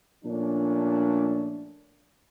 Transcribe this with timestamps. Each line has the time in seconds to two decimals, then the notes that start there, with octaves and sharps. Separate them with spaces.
0.24 A#2 F3 A3 C#4 D4